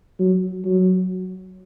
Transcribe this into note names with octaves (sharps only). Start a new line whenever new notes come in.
F#3
F#3